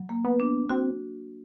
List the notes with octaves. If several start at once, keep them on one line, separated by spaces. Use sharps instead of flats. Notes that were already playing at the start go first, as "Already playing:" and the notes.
Already playing: F#3
A#3
B3
D4
C4 F#4